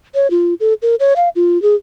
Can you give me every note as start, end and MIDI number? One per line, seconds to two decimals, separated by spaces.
0.15 0.30 73
0.31 0.54 65
0.60 0.74 69
0.82 0.95 70
1.00 1.13 73
1.16 1.29 77
1.36 1.61 65
1.62 1.75 68